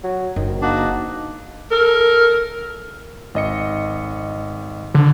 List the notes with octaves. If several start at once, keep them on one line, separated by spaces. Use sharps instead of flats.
F#3
F#1 D#3
A#3 D4 D#4 F#4
A4 A#4
G#1 D#5 C#7
D3